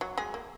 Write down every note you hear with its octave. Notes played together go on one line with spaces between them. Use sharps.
F#3 F#4
G#3 G#4
A#3